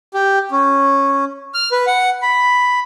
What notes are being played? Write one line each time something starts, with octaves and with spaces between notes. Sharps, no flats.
G4
C#4
F6
B4
F#5
B5